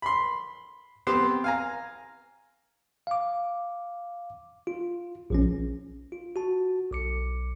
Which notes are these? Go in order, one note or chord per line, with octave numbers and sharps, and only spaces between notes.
B5 C6
B3 C4 G4 C5
F5 G#5 A#5
F5 D6
F4
A#1 F3 C#4
F4
F#4 A5
B1 D6 C#7